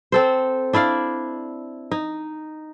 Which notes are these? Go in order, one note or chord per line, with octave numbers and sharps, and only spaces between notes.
C4 A4 C5
D4 E4 D5 F5
D#4